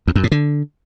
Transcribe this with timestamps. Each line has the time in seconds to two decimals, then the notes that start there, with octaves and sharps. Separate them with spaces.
0.07 E2
0.16 F#2
0.24 A2
0.32 D3